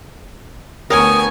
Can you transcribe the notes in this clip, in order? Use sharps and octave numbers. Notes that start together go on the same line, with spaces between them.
D2 B3 A#4 C#5 G5 G#5 C#6 D#6